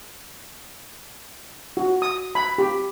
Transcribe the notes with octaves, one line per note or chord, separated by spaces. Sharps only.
F#4
D#6
B5
G4